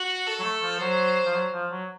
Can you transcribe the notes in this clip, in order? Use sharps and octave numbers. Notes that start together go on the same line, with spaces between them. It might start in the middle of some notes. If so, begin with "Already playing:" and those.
Already playing: F#4
A4
F#3
A3
F3
F#3 C5
F3
F#3
F3
F#3